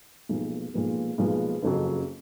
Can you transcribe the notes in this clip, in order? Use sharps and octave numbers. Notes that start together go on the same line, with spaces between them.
B1 A#2 F3 G#3 B3
B1 A#2 F3 G#3 B3
B1 A#2 F3 G#3 B3
F#1 F2 C#3 F#3